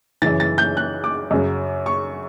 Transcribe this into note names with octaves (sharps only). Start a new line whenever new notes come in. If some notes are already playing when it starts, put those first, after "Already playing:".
F#2 C#3 E3 A6
A6
G6
F#6
D6
F#2 C#3 F#3
C#6